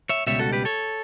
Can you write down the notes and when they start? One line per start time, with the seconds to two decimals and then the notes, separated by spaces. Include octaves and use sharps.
0.09 C#5 E5
0.27 C#2 B2 G3 C#5 E5
0.39 F#4 A4
0.52 G4 B4
0.65 A4 C#5